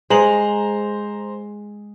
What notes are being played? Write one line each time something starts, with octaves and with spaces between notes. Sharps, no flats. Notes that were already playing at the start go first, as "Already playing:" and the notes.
G#3 C5 A#5 F#7